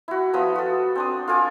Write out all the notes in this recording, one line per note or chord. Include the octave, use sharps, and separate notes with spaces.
E4 F#4
F3 B3 D#5 B5
F#4 A4
C4 D4 D#6
F4 A4 G#5 D6